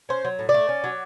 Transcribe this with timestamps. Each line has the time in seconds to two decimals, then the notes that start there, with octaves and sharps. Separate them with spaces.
0.09 C#4 C5
0.25 F#3
0.39 A2
0.49 D5
0.54 A3
0.69 C#4
0.84 F#3